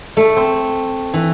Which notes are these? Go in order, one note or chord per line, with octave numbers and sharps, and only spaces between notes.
A3
C4
E3